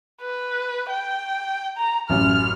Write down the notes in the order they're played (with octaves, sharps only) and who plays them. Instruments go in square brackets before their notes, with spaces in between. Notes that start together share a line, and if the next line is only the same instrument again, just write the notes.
[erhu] B4
G5
A#5
[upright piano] A1 F#2 [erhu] F6